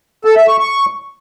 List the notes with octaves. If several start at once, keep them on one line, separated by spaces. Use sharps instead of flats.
A4
E5
C#6
C#6